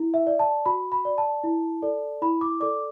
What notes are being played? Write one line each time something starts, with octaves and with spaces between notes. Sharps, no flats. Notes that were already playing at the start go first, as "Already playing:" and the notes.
Already playing: E4
E5
D5
A5
F#4 B5
B5
D5
A5
E4
A4 D5
E4 B5
D6
A4 D5 D6